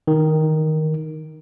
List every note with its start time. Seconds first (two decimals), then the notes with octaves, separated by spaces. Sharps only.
0.07 D#3